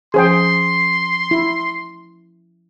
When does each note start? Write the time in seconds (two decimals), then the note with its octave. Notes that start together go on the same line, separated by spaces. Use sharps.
0.14 F3 C#4 G#4 C5 G5 C6
1.31 E4